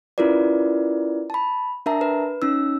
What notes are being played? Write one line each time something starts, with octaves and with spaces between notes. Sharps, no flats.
C#4 E4 F4 A#4 B4 D5
A5 B5
D4 A#4 E5 A5 A#5
B4
C#4 D#4 E6